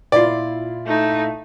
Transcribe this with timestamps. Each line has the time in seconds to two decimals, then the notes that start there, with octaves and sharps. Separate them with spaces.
0.12 A#2 E4 F4 D5
0.86 A3 D#4